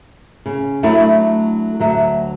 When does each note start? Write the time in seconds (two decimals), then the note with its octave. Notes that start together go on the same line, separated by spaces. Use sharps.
0.46 C#3
0.83 F#3 A3 D4 E4
1.79 D2 F#3 E5